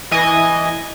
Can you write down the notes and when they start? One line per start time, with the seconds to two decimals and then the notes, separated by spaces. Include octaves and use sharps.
0.11 E3 D#5 G#5